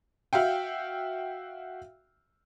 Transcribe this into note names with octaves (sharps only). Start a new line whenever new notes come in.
F#4 E5 F5 G5